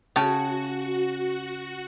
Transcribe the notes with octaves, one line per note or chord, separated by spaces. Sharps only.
C#3 F#4 C#5 G5 A5